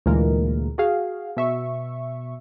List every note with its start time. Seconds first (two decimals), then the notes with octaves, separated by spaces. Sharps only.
0.06 D2 A#2 E3 G#3 A#3 A#4
0.78 F#4 G#4 F5
1.37 B2 E5 C#6